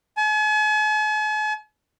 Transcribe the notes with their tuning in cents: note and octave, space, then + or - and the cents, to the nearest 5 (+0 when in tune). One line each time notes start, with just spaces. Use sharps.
G#5 +45